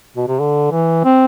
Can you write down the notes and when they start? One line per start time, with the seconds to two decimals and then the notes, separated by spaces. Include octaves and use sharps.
0.17 B2
0.28 C3
0.39 D3
0.71 E3
1.04 C4